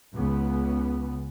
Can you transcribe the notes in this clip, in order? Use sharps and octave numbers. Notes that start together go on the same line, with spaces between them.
C#2 C#3 B3